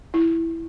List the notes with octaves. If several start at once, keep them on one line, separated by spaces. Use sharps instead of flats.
E4